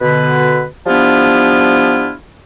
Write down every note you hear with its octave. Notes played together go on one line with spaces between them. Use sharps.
B2 D3 B4
F3 G3 B3 D4 E4 F4